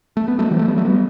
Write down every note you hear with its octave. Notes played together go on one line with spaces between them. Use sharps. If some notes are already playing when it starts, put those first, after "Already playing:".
A3
B3
F#3 A3
E3 G3
F#3 A3
G3 B3
F#3 A3
G3 B3